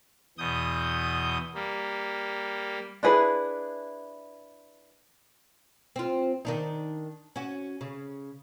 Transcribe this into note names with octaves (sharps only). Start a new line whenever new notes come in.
E2 B2 D#6 G6
G3 A#3
D4 E4 G#4 B4
C4 F4
D#3 D4 D#4
C#4 F#4
C#3